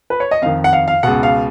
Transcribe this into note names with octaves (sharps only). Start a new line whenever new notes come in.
B4
C#5
D#5
F2 D#3 F5
F#5
F5
F5
C#2 B2 F#5
F5